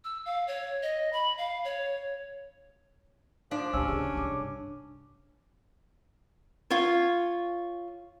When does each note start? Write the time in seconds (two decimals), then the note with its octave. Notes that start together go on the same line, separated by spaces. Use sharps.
0.04 E6
0.26 F5
0.48 C#5
0.83 D#5
1.13 B5
1.38 F5
1.65 C#5
3.51 F3 D4 D#4 F5
3.73 C#2 A#2 C#4 G4 D5 E6
3.88 C#3 G#4
4.14 G2 C3 A5 D6
6.70 F4 C#5